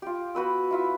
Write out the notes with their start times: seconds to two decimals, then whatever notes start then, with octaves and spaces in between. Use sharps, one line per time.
0.02 F4 G4
0.35 B3 F#4 B4 E6
0.71 E4 F4 E5